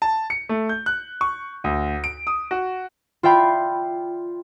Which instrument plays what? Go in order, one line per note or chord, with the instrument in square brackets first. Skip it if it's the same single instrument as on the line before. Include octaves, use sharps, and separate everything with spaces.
[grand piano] A5
C#7
A3
G6
F#6
C#6
D2
D7
D#6
F#4
[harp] F4 D5 E5 G5 B5